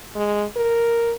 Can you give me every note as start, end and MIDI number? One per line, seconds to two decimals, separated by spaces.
0.15 0.44 56
0.56 1.14 70